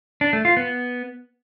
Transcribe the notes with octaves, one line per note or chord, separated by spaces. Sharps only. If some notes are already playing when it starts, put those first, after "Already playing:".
D4
A3
F4
B3